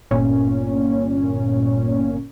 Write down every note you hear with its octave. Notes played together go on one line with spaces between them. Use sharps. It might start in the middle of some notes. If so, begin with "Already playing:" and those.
G1 A#2 C#4